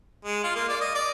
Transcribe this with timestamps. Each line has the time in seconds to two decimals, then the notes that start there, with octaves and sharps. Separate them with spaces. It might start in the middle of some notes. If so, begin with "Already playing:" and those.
0.25 G#3
0.44 F4
0.55 A#3
0.69 D5
0.81 D#5
0.94 D5